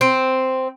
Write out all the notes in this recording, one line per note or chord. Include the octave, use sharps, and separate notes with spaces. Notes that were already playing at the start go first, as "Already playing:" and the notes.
C4